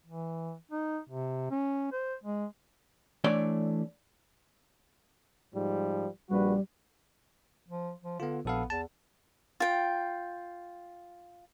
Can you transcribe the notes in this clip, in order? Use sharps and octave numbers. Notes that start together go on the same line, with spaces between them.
E3
D#4
C3
C#4
C5
G#3
E3 A3 D4 C#5 D5
G#2 F3 G3
A#1 G3 F#4 B4
F3
F3
D3 B3 F4
A#1 B3 A4 F5
E2 A5
F4 G5